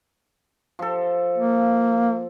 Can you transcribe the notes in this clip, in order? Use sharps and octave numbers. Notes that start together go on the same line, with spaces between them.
F3 A4
A#3